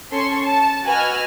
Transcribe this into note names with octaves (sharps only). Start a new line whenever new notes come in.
C#4 A4 C6 C#6
A5
F#4 B4 D#5 G#5 E6 F6